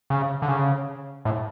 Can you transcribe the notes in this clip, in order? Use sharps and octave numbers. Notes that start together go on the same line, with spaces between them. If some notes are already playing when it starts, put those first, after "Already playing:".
C#3
D3
C#3
A2